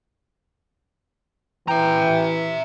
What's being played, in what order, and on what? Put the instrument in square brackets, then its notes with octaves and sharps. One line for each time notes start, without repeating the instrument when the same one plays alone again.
[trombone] E3 [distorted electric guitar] E5 A#5 [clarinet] G5